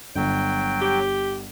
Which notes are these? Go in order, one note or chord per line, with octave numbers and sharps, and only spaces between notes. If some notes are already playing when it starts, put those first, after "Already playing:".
G1 F#3 G5
G4